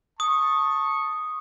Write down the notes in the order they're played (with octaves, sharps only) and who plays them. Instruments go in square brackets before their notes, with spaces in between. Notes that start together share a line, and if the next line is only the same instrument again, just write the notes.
[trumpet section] A5 C#6 [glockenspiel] D#6